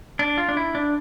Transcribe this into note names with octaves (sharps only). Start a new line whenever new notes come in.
D4
F4
D4
E4
D4